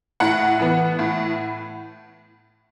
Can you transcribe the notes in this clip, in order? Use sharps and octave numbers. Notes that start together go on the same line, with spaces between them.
A2 F#5
E3 B3
A2